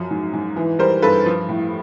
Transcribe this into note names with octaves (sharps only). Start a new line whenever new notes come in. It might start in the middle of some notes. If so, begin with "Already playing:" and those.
Already playing: F#2 F3
G#2
G#2
E3
G3 A#4 C5
G2 A4 B4
F3
A2